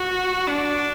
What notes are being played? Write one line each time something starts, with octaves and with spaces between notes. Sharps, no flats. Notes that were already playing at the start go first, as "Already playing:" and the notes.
Already playing: F#4
D4